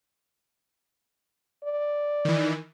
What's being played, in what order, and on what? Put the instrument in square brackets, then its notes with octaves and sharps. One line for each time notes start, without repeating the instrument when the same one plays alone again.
[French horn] D5
[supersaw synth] D#3 E3